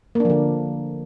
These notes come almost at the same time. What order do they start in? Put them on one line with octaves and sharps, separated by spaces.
A#3 D4 F3 D3